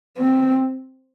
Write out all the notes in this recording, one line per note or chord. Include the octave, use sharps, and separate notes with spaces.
C4